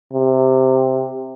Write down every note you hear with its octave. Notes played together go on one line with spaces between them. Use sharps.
C3